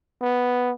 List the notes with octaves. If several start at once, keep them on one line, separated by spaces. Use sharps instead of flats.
B3